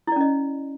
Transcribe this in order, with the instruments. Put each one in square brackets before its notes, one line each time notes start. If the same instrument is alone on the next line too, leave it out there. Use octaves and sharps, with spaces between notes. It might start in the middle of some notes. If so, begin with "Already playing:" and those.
[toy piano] E4
D5
C#4
D#5